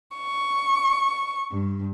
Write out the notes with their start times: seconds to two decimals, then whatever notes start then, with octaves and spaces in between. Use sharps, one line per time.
0.18 C#6
1.52 G2